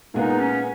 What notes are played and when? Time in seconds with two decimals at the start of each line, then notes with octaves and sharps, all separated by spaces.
0.14 A#2 G#3 B3 D#4 F4 G#4
0.39 C#4